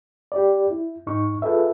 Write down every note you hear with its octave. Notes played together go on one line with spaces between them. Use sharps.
G4 D5
E4
G#2 D#4 C#6
F4 G#4 A4 B4 E5